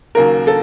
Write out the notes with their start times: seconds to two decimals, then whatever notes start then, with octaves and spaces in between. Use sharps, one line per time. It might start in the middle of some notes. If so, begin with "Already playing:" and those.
0.15 D#2 C#3 F#3 A#3 A#4
0.47 A4